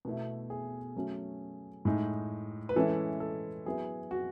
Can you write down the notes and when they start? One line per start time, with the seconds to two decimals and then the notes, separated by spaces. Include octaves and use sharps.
0.05 B2 A3 E4
0.50 G#4
0.96 F#3 A3 C#4
1.85 A2 G#3 D#4
2.69 B4
2.76 E3 G#3 C#4 E4 A4
3.20 A4
3.66 F#3 B3 E4 G#4
4.11 F#4